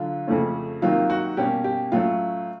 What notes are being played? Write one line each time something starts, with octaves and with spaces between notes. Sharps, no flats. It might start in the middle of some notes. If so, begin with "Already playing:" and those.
Already playing: D3 F#3 F4
F2 C#3 F3 A3 C#4
C3 D#3 F#3 A#3 F4
F#4
B2 G3 A#3 C#4 G4
G4
A2 F#3 A3 C#4 F4